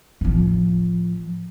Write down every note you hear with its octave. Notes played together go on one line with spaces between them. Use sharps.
A2 F3